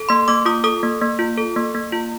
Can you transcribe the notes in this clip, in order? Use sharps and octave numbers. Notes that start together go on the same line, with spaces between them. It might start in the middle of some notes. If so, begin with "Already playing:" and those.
Already playing: A4
A#3 C6
A#3 D6
F4 D#6
A4 D#6
A#3
A#3
F4
A4
A#3
A#3
F4